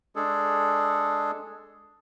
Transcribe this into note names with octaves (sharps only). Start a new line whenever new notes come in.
G#3 D4 G#4 A4